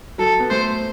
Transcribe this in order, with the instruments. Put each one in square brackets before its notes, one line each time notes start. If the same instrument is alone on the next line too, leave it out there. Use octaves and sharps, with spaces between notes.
[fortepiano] F#3 [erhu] A4
[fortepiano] B3
[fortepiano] A3 [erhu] C5